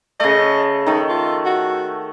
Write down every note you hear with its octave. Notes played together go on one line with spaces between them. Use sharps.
C#3 A3 D#5
D#3 A3 D#4
F4
F#4